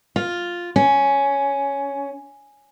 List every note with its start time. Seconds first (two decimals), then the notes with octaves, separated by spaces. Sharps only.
0.16 F4
0.76 C#4